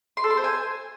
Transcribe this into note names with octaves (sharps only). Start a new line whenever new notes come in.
C6
A4
C6
C5
G#5